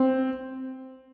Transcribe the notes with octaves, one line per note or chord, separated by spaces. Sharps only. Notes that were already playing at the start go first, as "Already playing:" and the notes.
Already playing: C4